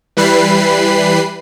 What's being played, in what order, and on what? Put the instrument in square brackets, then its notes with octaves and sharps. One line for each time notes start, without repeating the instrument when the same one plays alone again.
[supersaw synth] E3 G3 B4 B5 C7